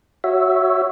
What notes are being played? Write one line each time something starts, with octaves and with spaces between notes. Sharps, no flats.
F#4 C#5 E5